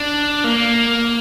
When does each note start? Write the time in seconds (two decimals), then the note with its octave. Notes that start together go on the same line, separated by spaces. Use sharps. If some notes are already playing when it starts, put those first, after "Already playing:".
Already playing: D4
0.44 A#3